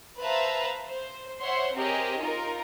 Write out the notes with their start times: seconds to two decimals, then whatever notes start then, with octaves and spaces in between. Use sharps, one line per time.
0.22 B4 C5 E5 F5 A5 A#5
0.88 C5
1.41 C5 C#5 E5 F#5 C6
1.75 C4 G4 G#4 A#4 C#5 D#5
2.20 D#4 F4 A#4